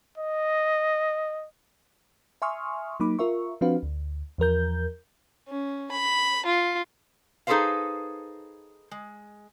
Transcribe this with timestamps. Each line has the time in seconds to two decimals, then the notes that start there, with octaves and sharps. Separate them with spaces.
0.18 D#5
2.42 E5 G#5 C6 C#6 D#6 F6
3.00 F#3 A#3 D#4 B5 D6
3.19 F4 A#4 E5 C#6
3.61 F3 C4 D4 F#4 B4 F5
3.83 D2
4.38 E2 F3 A#4 G6
5.48 C#4
5.91 B5
6.46 F4
7.47 D#4 G#4 A4 B4 C5 F5
8.91 G#3